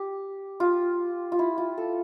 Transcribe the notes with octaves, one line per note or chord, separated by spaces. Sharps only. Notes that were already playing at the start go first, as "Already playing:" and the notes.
Already playing: G4
F4
F4
E4
F4
A4